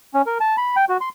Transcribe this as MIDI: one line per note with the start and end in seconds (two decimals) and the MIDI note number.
0.14 0.22 61
0.26 0.38 70
0.40 0.56 81
0.57 0.76 83
0.76 0.85 79
0.89 0.97 66
1.01 1.09 84